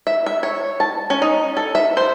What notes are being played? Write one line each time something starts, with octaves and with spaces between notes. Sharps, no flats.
E5
E5
C#5
A5
C#4
D#4
A4
E5
C5